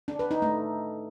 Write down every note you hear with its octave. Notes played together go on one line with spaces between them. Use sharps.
D4
B4
D#4
A3